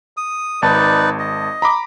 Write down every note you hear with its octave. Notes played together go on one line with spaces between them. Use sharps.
D#6
G#1 D#4 B4 D5 A5
D#5
A#5 B5 D6